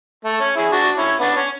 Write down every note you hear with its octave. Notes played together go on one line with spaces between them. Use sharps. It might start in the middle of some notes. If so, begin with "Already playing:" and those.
A3
C#4
E4 G#4
D4 F#4
C#4 E4
B3 D4
C#4